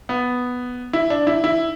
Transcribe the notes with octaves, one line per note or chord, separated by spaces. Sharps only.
B3
E4
D4
E4
E4